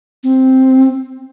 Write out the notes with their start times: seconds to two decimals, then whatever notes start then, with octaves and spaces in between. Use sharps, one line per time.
0.24 C4